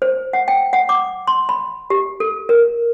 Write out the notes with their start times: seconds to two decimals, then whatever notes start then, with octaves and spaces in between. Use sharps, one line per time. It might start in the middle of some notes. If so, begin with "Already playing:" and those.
0.02 C5
0.33 F#5
0.48 G5
0.73 F#5
0.89 D6
1.27 C6
1.49 B5
1.90 G4
2.20 A4
2.49 A#4